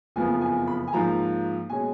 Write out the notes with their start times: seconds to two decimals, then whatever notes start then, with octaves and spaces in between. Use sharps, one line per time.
0.16 F#1 F2 F3 B3 G#5
0.41 G#5
0.67 B5
0.88 G#5
0.92 G#2 F3 A#3 A#5
1.70 B2 G#3 C#4 G#5